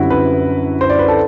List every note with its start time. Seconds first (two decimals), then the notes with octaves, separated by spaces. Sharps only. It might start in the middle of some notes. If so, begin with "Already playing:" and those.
Already playing: F#2 D3 G3 C4 E4 F#4
0.10 B4
0.81 C5
0.90 D5
0.99 B4
1.08 A4